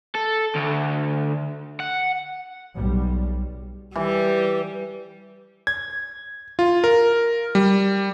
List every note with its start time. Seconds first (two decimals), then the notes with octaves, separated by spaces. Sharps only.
0.15 A4
0.55 D2
1.80 F#5
2.75 B1 G3
3.95 E3 G3
5.67 G#6
6.59 F4
6.84 A#4
7.55 G3